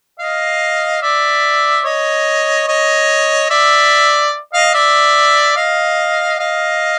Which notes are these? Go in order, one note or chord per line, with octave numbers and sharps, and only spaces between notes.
D#5 F5
D5 E5
C#5 D#5
C#5 D#5
D5 E5
D#5 F5
D5 E5
D#5 F5
D#5 F5